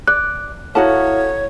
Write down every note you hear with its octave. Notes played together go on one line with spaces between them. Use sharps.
D5 F#6
E4 F#4 A4 C#5 F5 F#5 A5